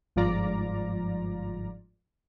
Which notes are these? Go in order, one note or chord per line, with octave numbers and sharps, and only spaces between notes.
G1 G#2 F3 F4 D5 A#5